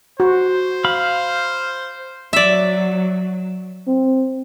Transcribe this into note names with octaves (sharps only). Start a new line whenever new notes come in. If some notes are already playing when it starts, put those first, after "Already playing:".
F#4 C5
F5 B5
F#3 D5 E5
C4